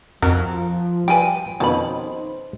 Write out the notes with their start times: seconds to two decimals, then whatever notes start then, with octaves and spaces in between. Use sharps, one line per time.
0.22 F2 F3 F#4 A#4
1.08 F#3 G3 F4 B4 G5 G#5
1.60 F2 B2 D#3 C#4 D#4 C5 B5